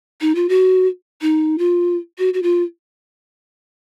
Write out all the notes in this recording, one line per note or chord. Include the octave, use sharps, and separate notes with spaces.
D#4
F4
F#4
D#4
F4
F#4
F#4
F4